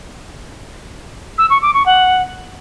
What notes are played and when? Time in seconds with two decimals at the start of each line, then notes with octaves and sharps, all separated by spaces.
1.38 E6
1.50 C#6
1.62 D6
1.74 C#6
1.86 F#5